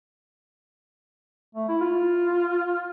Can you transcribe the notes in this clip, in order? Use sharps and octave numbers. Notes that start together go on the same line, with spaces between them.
A3
E4
F4